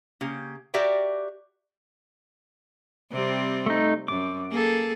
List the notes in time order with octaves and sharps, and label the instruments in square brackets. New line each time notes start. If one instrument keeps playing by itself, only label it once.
[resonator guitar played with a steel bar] C#3 A#3 G4
F#4 G4 A#4 D5 E5 G5
[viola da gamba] C3 G3 C4
[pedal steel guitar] A3 D#4
[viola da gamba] F#2 [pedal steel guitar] D6
[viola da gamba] A#3 G#4 A4